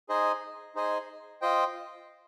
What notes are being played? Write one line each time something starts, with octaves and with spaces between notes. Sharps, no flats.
D#4 G#4 C5 D#5 G#5
D#4 G#4 C5 D#5 G#5
F4 C5 D#5 G5